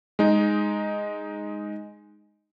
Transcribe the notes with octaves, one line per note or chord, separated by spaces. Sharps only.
G#3 D#4